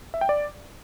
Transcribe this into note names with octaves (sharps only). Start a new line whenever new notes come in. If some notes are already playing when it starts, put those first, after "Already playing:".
E5
G5
D5